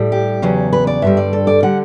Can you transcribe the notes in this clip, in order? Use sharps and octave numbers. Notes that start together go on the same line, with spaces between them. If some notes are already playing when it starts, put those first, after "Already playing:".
Already playing: A2 G3
G4
E2 C#3 F#3
B4
D5
G2 D3 G3 E5
D5
A4
D5
D3 G3 F#5